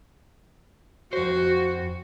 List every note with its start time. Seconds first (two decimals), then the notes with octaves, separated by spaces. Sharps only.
1.13 F2 F#4 C5